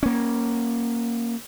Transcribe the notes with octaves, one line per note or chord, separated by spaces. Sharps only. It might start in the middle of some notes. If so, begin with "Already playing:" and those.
A#3 C#4